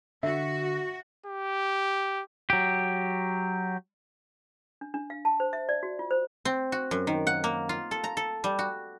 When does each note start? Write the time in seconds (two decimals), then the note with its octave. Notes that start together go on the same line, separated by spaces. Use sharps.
0.23 D3 F#4 E5
1.26 G4
2.50 F#3 G4
4.81 D4
4.94 D4
5.10 F5
5.25 A5
5.40 C5
5.53 E5
5.69 D5
5.83 F#4
5.99 F4
6.11 C5
6.45 C4
6.72 F#4
6.91 F#2
7.07 D#3
7.27 F#5
7.44 A#3
7.69 F4
7.91 A4
8.04 A#5
8.17 A4
8.44 G3
8.59 F#4